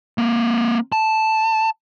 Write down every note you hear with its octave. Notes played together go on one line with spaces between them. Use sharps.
A#3 C4
A5